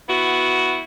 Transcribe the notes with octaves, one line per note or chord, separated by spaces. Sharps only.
B3 E4 F#4